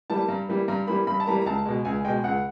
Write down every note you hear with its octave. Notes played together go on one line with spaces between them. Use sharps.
E3 G3 A#3 A5
G2 A#5
E3 G3 A#3
G2 A#5
E3 G3 A#3 B5
G2 B5
A5
E3 G3 A#3 A#5
A#5
C#2 A5
B2 G#3
C#2 G#5
B2 G#3 G5
C#2 F#5